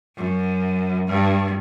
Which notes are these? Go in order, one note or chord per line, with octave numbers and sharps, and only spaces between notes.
F#2
G2